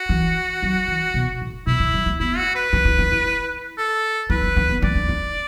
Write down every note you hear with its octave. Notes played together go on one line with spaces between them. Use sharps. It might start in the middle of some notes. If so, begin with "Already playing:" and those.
Already playing: F#4
E3
F#3
E3
B2
A2
B2 E4
D3
F#3
A3
B3 E4
F#4
B4
D4
E4
D4
E4
A4
E4 B4
D4
D4
B3
A3 D5
D4
D4